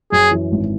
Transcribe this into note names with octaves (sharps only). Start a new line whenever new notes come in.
F#2 G#4
E3
G#1